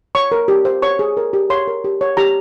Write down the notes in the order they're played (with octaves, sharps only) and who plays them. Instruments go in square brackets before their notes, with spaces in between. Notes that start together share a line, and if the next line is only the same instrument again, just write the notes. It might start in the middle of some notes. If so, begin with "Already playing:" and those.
[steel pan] C#5 C#6
A#4
G4
C5
C#5 C#6
G#4
A#4
G4
C#5 C6
A#4
G4
C#5
G4 A#5